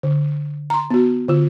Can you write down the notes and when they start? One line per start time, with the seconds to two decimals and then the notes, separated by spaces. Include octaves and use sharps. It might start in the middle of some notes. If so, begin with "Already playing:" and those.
0.03 D3
0.70 A#5 C6
0.91 B3 F#4
1.28 D3 F4